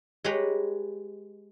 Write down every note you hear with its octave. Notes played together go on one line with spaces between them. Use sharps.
G#3 G4 B4 C#5 A#5 B5